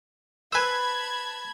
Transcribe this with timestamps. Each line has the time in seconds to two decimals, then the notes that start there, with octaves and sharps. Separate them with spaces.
0.52 B4 C5 G#5 A5 B5 E6 G#6